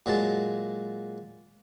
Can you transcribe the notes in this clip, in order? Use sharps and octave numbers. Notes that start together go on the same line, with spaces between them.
A#2 F#3 G#3 A5